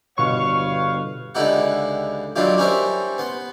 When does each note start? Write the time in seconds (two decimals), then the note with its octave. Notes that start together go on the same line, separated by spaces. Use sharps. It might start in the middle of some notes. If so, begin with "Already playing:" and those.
0.18 G1 B2 B4 C#5 F5 C#6
1.35 C#2 D3 D#4 E4 G4 F#5
2.36 D#3 F#3 D4 E4 F4 G4
2.57 G3 C#4 D#4 A#4 C5 E5
3.18 B3 C6